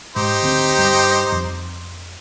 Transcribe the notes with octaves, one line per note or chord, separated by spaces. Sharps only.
G#2 D#4 G4 C5
D2 C4
G2
F2